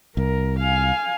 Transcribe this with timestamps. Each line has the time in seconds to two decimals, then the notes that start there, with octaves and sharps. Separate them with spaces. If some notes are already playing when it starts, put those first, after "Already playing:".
0.17 C2 A#4
0.59 F5 G#5